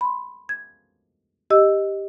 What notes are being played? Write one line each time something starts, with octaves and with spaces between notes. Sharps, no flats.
B5 C6
G#6
G4 D#5 E6